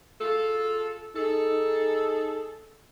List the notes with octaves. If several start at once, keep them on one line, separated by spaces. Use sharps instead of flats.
F4 G#4 A4
D#4 G#4 A4